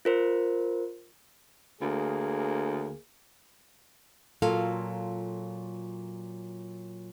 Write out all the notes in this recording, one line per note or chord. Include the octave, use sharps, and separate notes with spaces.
F4 A#4 C5
D2 A#3 G#4
A#2 F#3 F4 A4 F5